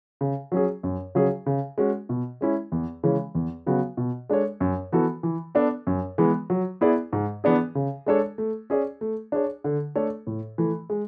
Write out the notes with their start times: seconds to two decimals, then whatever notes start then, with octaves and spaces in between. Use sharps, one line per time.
0.21 C#3
0.52 F#3 C#4 G#4
0.83 F#2
1.15 C#3 F#3 C#4 G#4
1.46 C#3
1.78 G#3 C#4 F#4
2.09 B2
2.41 G#3 C#4 E4
2.72 E2
3.03 C#3 E3 G#3 C#4
3.35 E2
3.66 C#3 F#3 B3 F#4
3.97 B2
4.30 G#3 D4 A4 C#5
4.60 F#2
4.92 E3 B3 F#4 A4
5.23 E3
5.55 B3 D4 A4
5.87 F#2
6.18 E3 G#3 B3
6.50 F#3
6.81 B3 E4 G#4 D5
7.13 G#2
7.44 E3 B3 D4 G#4
7.75 C#3
8.06 G#3 D4 A4 C#5
8.38 A3
8.70 C#4 G#4 D5
9.01 A3
9.32 D4 G#4 C#5
9.64 D3
9.95 A3 D4 A4 C#5
10.27 A2
10.58 E3 A3
10.90 G#3